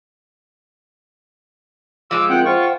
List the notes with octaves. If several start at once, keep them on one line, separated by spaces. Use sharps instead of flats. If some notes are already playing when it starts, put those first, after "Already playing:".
F3 G#3 D6 E6
C4 F4 A#4 F#5 G5
F4 C5 F#5 G5 C#6